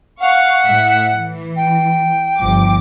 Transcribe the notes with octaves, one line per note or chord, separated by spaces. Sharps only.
F5 F#5 C#6
A2 E5
E3
G5
G1 F3 D6